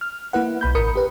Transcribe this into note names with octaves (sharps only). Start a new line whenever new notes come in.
F6
A#3 E4 B4 F#5
B1 B5 G6
A1 A#4 B5 D#6 C#7
G4 B4